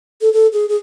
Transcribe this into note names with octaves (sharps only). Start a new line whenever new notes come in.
A4
A4
G#4
G#4